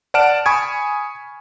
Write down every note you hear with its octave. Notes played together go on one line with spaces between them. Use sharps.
D5 F#5 A5 F6 D7 E7
G#5 B5 C#6 D#6 G#6